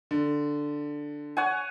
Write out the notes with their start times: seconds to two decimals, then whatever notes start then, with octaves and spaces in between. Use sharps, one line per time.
0.11 D3
1.37 C#5 F#5 G#5